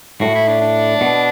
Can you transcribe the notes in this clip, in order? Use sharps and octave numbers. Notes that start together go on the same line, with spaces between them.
A2 F#4
E4
D4
D4
B2